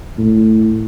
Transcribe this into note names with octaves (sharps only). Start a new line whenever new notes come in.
A2